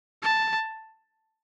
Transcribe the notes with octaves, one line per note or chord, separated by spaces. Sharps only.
A5